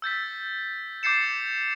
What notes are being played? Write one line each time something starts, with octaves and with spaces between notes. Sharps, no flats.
E6 G6 A6 B6
D6 G6 A6 C7 C#7 E7